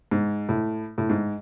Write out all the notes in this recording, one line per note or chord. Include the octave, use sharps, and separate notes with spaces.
G#2
A2
A2
G#2